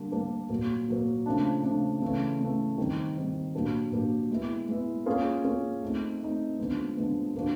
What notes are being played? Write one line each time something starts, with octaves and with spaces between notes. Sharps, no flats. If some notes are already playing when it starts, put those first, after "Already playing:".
Already playing: D3 G3 A#3 D4
D3 G3 A#3 D4
A#2 F#3 A#3
A#2 F#3 A#3
C#3 F3 A3 D4
C#3 F3 A3 D4
C#3 E3 A3
C#3 E3 A3
C3 D#3 G3
C3 D#3 G3
A#2 F#3 A#3 D4 G4
A#2 F#3 A#3 D4 G4
G#3 B3 E4
G#3 B3 E4
A#3 C#4 F4 G#4
A#3 C#4 F4 G#4
A3 C4 D#4
A3 C4 D#4
D3 F3 G#3 B3
D3 F3 G#3 B3
D3 F3 A#3 D4 F#4